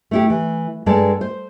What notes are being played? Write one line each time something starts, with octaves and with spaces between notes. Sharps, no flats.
A3 E4 G4
E3
G2 G#3 A4 D5 A5
C5